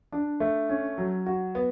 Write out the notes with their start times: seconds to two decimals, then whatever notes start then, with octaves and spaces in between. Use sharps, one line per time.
0.12 D4
0.40 A3
0.70 C#4
0.98 F#3
1.26 F#4
1.55 B3